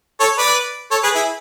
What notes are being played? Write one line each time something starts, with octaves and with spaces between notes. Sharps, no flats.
A4 C#5
B4 D5
A4 C#5
G#4 B4
E4 G#4